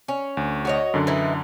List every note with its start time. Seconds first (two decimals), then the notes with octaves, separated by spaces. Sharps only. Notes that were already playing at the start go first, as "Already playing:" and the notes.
0.08 C#4
0.37 D2
0.65 F#4 C#5 D#5
0.94 F#2 D3
1.07 E3 D#4 E4